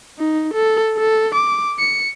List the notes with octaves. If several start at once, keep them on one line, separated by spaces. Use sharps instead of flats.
D#4
A4
A4
D6
C#7